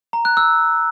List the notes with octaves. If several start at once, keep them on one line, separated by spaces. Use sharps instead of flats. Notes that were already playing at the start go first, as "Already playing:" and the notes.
A#5
F#6
E6